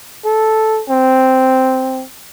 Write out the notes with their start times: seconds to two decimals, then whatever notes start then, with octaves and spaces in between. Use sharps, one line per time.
0.25 A4
0.89 C4